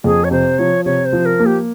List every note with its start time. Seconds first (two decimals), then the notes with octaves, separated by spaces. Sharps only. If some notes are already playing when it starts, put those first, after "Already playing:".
0.04 F2 G#4
0.24 C#5
0.31 C3 C5
0.59 F3 C#5
0.85 C3 C#5
1.06 C5
1.12 F3
1.26 A#4
1.39 A#3
1.46 G4